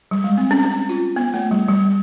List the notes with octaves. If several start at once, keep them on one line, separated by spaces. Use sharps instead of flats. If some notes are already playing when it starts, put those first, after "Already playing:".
G3
G#3
C4
C#4
C#4
F4
B3
A3
G3
G3